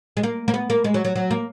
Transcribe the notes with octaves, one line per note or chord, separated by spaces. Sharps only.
G#3
A#3
A#3
B3
A#3
G#3
F#3
F#3
F#3
A#3